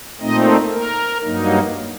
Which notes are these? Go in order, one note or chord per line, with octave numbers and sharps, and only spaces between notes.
A#2 A3 C4 D#4 D#5
A#4
G2 F#3 A#3 D#4